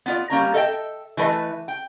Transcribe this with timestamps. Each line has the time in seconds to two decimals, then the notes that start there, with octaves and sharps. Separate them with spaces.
0.06 B3 F4 D5
0.30 G3 A#3 C#4 A#5
0.54 A4 D#5 E5 G5
1.17 E3 A3 B4 D#5 E5
1.68 G5